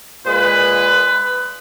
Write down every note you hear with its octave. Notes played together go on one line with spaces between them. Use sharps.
A#2 G#3 B4